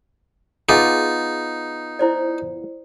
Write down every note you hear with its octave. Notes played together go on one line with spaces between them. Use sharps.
B3 D#4 F4 G#4 G#5
E4 C5 D5